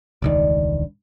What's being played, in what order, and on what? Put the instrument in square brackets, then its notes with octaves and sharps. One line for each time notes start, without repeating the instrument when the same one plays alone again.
[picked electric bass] E1 C#2 D#3 [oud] G2 D5